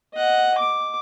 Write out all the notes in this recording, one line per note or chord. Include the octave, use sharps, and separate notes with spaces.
D#5 F#5
D6